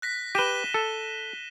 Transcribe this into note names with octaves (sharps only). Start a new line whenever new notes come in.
F#6 A#6 B6
G4 B4 D#7 E7 G7
A4